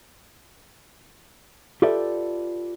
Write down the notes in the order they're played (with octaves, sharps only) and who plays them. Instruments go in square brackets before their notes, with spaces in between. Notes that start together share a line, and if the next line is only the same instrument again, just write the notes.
[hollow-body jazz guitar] F4 G4 A4 B4 D5 E5